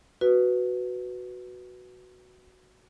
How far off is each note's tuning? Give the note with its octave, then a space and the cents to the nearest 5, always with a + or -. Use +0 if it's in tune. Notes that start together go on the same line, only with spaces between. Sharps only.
F#4 +0 B4 +0